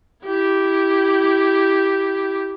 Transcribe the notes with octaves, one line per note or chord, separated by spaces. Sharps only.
E4 G4